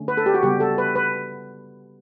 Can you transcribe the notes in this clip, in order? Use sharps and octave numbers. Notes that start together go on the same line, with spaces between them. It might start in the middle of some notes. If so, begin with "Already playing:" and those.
Already playing: D3 A3 C#4
B4
A4
G4
F#4
C#3 G3 B3 G4
A4
B4
B4